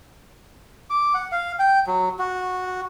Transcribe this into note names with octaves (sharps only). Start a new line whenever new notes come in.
D6
F#5
F5
G5
F#3
F#4